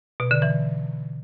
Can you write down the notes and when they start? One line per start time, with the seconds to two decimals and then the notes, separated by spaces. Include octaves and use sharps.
0.20 B2
0.31 D3
0.42 E3